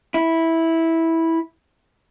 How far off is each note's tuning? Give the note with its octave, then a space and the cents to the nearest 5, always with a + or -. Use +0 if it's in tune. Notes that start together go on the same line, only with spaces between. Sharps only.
E4 -10